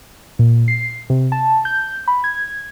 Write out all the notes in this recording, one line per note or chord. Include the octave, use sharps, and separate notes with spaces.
A#2
C7
C3
A5
G6
B5
G#6